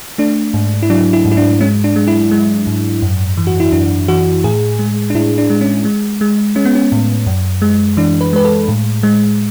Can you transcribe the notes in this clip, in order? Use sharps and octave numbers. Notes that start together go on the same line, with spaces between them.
A3 D4
G#2
E4
F#3 D4
E4
G#2
E4
D4
G#3 C#4
D4
G#3
E4
G#3
G#2
F#2
E3
F#4
E4
F#2 D4
E3 F#4
A2 G#4
G#3
D4
A2 E4
D4
G#3
C#4
G#3
G#3
G#3 C#4
B3
C#4
A2
F#2
G#3
E3 D4
B4
G#3 B4
A4
A2
G#3